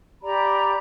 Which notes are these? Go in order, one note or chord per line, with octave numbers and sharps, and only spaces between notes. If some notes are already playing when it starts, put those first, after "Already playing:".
G4 D5 A#5 B5